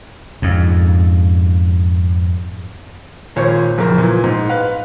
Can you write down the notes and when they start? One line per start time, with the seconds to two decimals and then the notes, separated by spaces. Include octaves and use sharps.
0.42 F2 G#2
3.36 G#1 A#2 C5 C#5
3.78 F#1 F2 A#3 A#4
3.98 A#2 E3
4.24 G#2
4.49 B4 F5